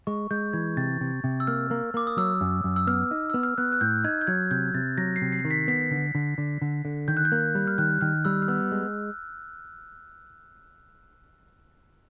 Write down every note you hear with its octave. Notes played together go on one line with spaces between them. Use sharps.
G#3 C#6
G#3 G6
E3 G#6
C3 A6
C3
C3
E6
A#3 F6
A#3
A#3 D6
D#6
F#3 E6
F#2
F#2
E6
B3 F6
D#4
B3 E6
F6
B3 F#6
F#6
A2 G6
D#4 G#6
G6
F#3 G#6
C3 G6
C3 A6
F#3 A#6
C7
C3
C7
D#3
B6
B3 B6
D3
D3
D3
D3
D3
D#3 G6
F#6
G6
A#3
G3
F6
D#3 F#6
D#3 F6
G3 E6
F6
B3 E6
G#3